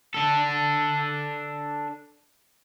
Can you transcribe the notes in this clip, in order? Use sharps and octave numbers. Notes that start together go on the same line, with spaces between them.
D4 A4